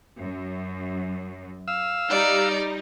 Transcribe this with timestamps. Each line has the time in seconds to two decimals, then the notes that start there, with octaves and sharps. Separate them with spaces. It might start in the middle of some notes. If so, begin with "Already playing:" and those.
0.20 F#2
1.68 F5 E6
2.10 G3 D#4 D5